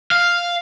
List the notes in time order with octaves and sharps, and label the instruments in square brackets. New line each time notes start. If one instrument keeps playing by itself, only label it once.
[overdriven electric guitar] F5